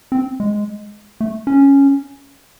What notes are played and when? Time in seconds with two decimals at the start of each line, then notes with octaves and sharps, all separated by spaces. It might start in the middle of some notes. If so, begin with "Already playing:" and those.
0.12 C4
0.40 G#3
1.20 A3
1.47 C#4